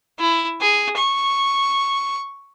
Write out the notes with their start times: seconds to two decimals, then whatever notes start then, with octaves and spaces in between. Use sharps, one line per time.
0.19 E4
0.61 G#4
0.97 C#6